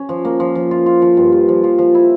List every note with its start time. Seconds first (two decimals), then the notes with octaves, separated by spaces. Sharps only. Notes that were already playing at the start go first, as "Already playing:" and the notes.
Already playing: C#4
0.09 F3
0.25 A#3
0.40 F3
0.55 F3
0.71 F4
0.86 F4
1.02 F3
1.17 G2
1.32 F4
1.48 F3
1.64 F3
1.78 F3
1.95 E4